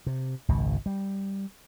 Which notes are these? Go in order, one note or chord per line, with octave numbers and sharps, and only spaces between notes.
C3
G#1 C#2 B2
G3